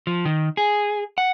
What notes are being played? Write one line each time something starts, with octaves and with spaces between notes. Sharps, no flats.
F3
D#3
G#4
F#5